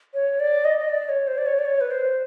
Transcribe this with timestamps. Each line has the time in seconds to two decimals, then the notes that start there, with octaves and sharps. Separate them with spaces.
0.14 C#5
0.40 D5
0.65 D#5
0.79 D#5
0.90 D5
1.09 C#5
1.27 C5
1.38 D5
1.46 C#5
1.59 D5
1.65 C#5
1.81 B4
1.91 C5